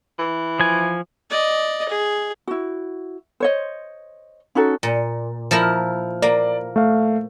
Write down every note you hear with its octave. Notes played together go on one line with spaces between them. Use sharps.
E3
F3 G#5
D5 D#5
G#4
E4 F#4
C5 C#5 D#5
C#4 D#4 F#4 A4
A#2
F3 E4 A#4
F6
A#3 D5
A3 F5